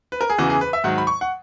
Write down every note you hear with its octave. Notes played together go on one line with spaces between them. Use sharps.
B4
A#4
G#4
E2 C#3 E3 F#4
G#4
B4
E5
G#2 D#3 F#3 F#5
B5
C#6
F#5